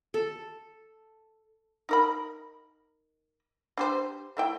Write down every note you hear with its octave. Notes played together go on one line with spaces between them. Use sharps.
A4
D#4 A#4 B5
D4 G4 C5
A3 E4 G5